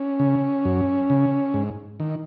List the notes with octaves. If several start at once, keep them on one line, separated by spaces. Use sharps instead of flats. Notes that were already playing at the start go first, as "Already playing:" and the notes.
Already playing: C#4
C#3
F#2
C#3
G#2
D#3